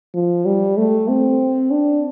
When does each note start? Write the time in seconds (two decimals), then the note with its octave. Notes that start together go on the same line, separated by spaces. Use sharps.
0.14 F3
0.46 G3
0.77 A3
1.08 C4
1.71 D4